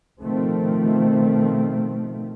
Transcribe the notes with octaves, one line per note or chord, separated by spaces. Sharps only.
B2 D#3 F3 A3 C4